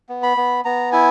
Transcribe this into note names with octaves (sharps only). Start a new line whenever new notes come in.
B3
B5
B3
B3 A#5
E4 G#5